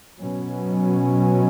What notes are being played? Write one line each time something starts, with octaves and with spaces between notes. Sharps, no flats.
B2 F#3 C#4